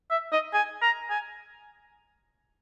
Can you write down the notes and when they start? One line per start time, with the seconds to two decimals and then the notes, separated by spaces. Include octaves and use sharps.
0.11 E5
0.32 D#5
0.53 G#5
0.82 A#5
1.10 G#5